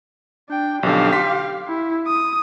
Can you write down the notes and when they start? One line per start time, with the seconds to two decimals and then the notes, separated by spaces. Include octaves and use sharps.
0.49 D4 G5
0.83 B1 F2 D3 G4 F5
1.13 C6 B6
1.69 E4
2.07 D#6